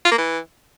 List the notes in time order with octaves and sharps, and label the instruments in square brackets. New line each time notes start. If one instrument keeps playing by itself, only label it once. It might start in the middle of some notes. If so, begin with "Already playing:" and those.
[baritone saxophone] F4
A#3
E3